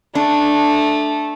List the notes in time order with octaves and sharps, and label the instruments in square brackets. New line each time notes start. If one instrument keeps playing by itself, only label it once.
[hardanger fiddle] A3 [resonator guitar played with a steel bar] D4